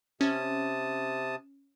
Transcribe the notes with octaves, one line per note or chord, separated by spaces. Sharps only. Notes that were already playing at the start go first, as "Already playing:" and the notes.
C3 C#4 A5 D#6